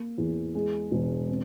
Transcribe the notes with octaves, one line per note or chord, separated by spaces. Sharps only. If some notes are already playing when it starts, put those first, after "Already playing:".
Already playing: A#3
E2
G#3
E1
C4